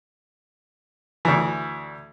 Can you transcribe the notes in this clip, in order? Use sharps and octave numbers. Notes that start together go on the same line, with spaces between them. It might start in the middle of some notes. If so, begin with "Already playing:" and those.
D2 E3